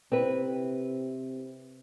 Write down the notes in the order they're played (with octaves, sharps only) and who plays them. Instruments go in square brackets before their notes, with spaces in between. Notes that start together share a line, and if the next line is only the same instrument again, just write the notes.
[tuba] C3 [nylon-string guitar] C4 E4 B4